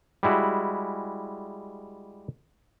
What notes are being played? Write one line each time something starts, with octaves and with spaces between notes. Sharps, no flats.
G3 G#3 E4 F#4